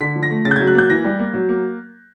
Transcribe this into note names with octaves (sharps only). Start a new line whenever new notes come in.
D3 B6
F3
A#6
A3
C#3 A6
G6
G#6
F#3
F#6
A#3 G6
E3 A#6
G3
A#3
F#3
A#3